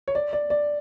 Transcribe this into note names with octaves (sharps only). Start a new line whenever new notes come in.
C#5
D5
D5
D5